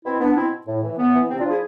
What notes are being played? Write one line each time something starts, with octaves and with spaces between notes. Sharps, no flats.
B2 C4 E4
B3 D4
B2 C4 E4
A2
E3
A2 B3
E3
C3 C4
D4 F4
F3
E4 G#4